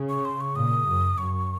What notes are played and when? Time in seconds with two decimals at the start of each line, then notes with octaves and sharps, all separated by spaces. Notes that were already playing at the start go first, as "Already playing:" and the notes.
Already playing: C#3
0.09 C#6
0.25 C6
0.40 C#6
0.56 A#2 D#6
0.88 F#2
1.18 F#2 C#6